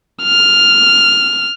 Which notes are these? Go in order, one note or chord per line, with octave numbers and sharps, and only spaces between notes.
F6